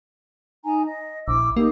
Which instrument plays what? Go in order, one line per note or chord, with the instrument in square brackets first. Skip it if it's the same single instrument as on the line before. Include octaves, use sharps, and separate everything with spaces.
[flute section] D#4 G#5 A#5
D#5
[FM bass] A#1 [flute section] E4 D6 E6
[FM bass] A#3 [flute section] D#4 G4